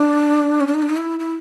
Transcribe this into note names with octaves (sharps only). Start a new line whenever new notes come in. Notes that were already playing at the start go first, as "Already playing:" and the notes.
Already playing: D4
C#4
D4
D#4
D4
D#4
E4
E4